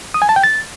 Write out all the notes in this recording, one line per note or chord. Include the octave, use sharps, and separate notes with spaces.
D#6
G#5
A5
G5
A6